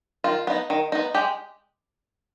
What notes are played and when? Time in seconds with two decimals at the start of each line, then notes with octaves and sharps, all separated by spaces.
0.24 D#3 F4
0.47 B3 D#4
0.70 D#3
0.92 B3 D#4
1.14 G#3 G4